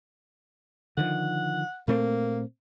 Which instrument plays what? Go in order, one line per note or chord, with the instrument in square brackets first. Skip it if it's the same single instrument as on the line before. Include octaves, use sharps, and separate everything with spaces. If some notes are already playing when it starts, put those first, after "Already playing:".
[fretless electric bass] D3 D#3 F3 [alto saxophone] F#5
[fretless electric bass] A#2 A3 C4 [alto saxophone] A#3